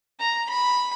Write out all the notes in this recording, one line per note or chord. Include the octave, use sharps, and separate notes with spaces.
A#5
B5